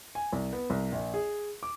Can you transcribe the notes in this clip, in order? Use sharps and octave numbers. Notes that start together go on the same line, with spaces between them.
G#5
C2
B3
C2
A#1
G#4
D6